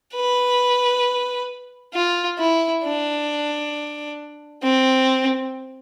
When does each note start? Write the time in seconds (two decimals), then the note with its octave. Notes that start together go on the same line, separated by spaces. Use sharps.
0.14 B4
1.94 F4
2.39 E4
2.83 D4
4.63 C4